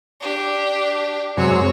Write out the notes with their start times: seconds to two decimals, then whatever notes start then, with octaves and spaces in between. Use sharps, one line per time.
0.20 D4 G4
1.37 F#2 C3 G#3 F#4 C#5